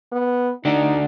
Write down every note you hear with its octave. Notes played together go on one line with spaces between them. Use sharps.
B3
D3 D4 D#4 F#4